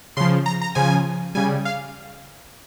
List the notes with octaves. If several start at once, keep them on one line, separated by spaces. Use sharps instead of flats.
C#3 F3 C6
A#5
A#5
C#3 F3 G#5
C#3 G3 G#5
F5